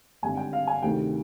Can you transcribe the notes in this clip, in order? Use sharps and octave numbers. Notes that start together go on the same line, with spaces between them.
G#1 G2 D3 G#5
G5
F5
G#5
D2 C3 D#3 G5